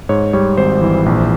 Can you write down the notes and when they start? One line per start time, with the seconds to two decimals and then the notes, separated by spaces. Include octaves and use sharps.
0.09 G#2 C#5
0.33 G3 C#5
0.58 G#1 C5
0.81 E3
1.06 A#1